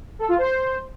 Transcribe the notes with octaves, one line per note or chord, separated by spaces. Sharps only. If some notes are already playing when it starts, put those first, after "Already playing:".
A4
F4
C5